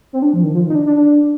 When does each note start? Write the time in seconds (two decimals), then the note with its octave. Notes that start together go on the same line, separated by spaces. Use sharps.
0.13 C4
0.22 D4
0.34 F3
0.43 D#3
0.54 F3
0.65 D#3
0.70 D#4
0.75 D4
0.86 D4
0.96 D4